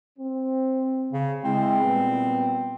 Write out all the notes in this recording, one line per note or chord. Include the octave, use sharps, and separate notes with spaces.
C4
C#3
G#3 C4 E4
A#2 G3 B3